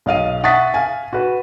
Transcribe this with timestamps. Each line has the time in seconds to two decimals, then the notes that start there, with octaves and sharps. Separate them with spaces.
0.06 B1 D#5 F5 D#7
0.43 E5 F#5 C#6 D#6 A6 B6
0.74 F5 G#5
1.13 F#4 B4